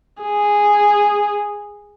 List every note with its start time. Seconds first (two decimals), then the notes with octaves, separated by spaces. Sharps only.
0.23 G#4